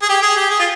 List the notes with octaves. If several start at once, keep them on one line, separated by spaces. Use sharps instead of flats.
G#4
G4
G#4
G4
G#4
F4